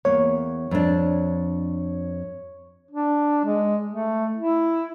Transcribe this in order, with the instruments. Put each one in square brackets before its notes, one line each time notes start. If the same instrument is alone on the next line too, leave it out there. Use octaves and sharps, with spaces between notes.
[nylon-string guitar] E2 A#3 [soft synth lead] C#5
[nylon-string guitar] F2 D4
[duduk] D4
G#3
A3
E4